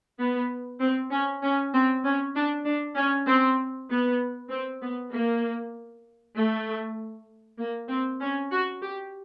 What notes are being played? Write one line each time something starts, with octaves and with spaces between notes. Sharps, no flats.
B3
C4
C#4
C#4
C4
C#4
D4
D4
C#4
C4
B3
C4
B3
A#3
A3
A#3
C4
C#4
F#4
G4